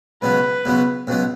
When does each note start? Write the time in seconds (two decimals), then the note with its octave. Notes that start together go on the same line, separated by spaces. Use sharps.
0.22 C#2 B2 F#3 B4
0.65 C#2 B2 F#3
1.07 C#2 B2 F#3